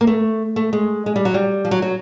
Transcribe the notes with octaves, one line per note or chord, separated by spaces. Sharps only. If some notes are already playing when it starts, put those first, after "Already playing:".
A#3
A3
A3
G#3
G#3
G3
F#3
G3
F3
F#3
F#3